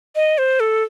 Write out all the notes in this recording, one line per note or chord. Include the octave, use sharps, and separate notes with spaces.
D#5
C5
A4